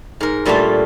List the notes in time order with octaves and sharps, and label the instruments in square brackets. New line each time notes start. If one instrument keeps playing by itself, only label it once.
[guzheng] G#2 A#4
G2 A#2 G3 A3 F4 A5